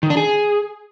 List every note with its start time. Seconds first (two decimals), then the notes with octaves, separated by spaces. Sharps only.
0.03 D#3
0.10 D4
0.17 G#4